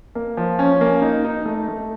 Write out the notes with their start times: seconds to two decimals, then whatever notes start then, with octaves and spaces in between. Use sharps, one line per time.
0.15 A#3
0.37 F3
0.59 C#4
0.81 A#3
1.02 D#4
1.24 D#4
1.46 A3
1.68 A3